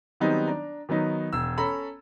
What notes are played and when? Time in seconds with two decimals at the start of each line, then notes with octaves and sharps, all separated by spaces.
0.20 D#3 F#3 G3 B3 C4 D#4
0.47 D4 A#5
0.89 D#3 F#3 B3 D#4
1.33 E1 E6
1.58 C#4 A4 A#5 B5